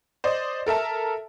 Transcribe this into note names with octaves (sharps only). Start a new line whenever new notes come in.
C5 D5 D#5
A4 A#4 E5 A5